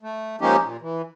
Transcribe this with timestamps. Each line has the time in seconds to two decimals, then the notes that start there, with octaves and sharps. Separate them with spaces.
0.02 A3
0.41 F3 G#3 A#3 C#4 D#4 G4
0.64 A#2
0.81 E3